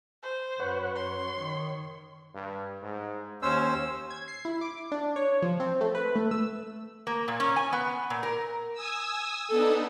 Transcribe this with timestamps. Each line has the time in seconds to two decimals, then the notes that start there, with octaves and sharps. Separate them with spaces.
0.23 C5
0.60 F#2 B4 C#5 F#5
0.96 C#5 C6
1.38 D#3
2.35 G2
2.83 G#2
3.42 D#2 C#4 C5 E6
4.10 G#6
4.28 C7
4.45 E4
4.61 D6
4.92 D4
5.16 C#5
5.42 F3
5.60 C4
5.81 A3
5.95 B4
6.16 A3
6.31 E6
7.07 A#3
7.28 A#2
7.40 C#4
7.56 G#5
7.73 B3
8.10 A#2
8.23 A#4
8.73 G#5 D#6 E6
9.50 B3 D4 D#4 A4